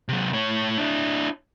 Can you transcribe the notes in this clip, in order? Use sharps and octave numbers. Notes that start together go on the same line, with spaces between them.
C3 F#3
A2 C#5
D4 E4